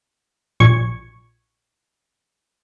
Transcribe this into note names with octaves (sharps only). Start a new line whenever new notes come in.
A#1 C#6 G#6